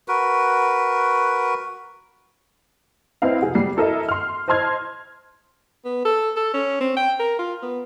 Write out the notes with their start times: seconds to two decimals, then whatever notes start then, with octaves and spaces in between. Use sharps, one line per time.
0.08 F#4 A#4 B4
3.22 C4 E4 B4 D#5 F5
3.42 F1 G#4 F#5
3.55 G3 C7
3.77 E4 A4 A#4 D#5 E5
4.09 C6 F6
4.48 C5 D#5 A5 C6 F6 G#6
5.85 B3
6.05 A4
6.36 A4
6.54 C#4
6.81 C4
6.96 G5
7.19 A#4
7.39 F4
7.62 B3